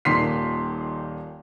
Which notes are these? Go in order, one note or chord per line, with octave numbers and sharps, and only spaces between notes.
D#1 A#2 D#3 C6 B6 C7